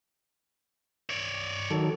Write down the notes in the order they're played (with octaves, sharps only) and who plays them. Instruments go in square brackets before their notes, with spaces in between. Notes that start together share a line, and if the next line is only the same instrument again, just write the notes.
[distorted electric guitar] C#5 D5
[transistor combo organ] D#3 F#3 A4